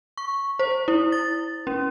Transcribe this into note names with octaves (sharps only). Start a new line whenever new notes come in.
C#6
C5
E4
A6
C#4